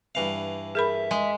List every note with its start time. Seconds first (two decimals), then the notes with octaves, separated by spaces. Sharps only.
0.15 G2 E3 F5
0.75 G#4 A#4 E5 B5
1.11 G#3